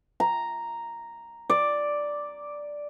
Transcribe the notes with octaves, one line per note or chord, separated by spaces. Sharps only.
A#5
D5